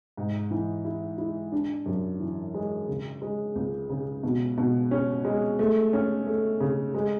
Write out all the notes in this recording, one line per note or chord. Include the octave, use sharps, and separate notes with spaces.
G#2
E3
E4
E4
D4
F#2
E3
G#3
C#3
G#3
C#2
C#3
B2
B2
C#4
G#3
A3
C#4
A3
C#3
G#3